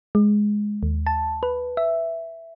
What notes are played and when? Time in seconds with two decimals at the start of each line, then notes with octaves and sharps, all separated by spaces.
0.15 G#3
0.83 D#2
1.07 A5
1.43 B4
1.77 E5